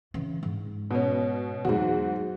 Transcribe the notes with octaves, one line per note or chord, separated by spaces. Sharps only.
C#3 E3
G#2
B2 C#4
E2 G#2 F#3 F#4